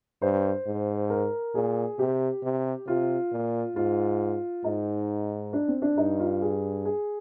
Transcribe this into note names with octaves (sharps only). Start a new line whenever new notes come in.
G2 C5
G#2
A#4
A#2 G#4
C3 G4
C3
C3 F4
A#2
G#2 F4
G#2 D#4
D4
C4
D4
G2 D#4
F4
G#4
G#4